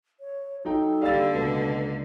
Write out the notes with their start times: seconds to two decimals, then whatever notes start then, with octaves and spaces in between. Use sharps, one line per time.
0.20 C#5
0.65 F#3 D#4 A4 G5
1.02 D3 G3 A#3 F5 E6 A6
1.34 C#2 B2